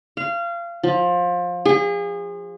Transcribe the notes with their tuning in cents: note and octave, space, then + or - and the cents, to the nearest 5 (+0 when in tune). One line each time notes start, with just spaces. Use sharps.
F5 -25
F3 +20
G#4 -35